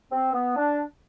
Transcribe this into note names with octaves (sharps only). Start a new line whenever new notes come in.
C4
B3
D4